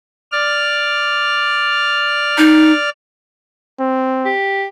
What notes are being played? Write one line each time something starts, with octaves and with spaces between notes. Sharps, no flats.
D5 F6
D#4
C4
G4